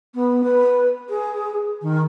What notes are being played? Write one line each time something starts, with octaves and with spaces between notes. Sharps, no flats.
B3
B4
G#4
D#3